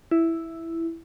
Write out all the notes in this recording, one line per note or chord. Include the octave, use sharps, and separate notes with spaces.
E4